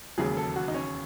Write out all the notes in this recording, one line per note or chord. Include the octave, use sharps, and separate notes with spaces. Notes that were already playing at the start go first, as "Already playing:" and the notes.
E1 D#2 C#3 F#3 G#4
A4
F#4
D#4
C#4